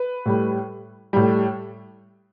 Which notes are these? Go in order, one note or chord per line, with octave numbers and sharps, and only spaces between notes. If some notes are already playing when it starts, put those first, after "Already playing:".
Already playing: B4
A2 G3
A2 G3